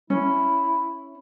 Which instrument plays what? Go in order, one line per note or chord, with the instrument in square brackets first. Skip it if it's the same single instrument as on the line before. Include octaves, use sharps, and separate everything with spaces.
[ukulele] C#4 [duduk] E4